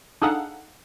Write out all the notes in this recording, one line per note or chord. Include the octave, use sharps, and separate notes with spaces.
D4 D#4 G#4 A4 F5 F#5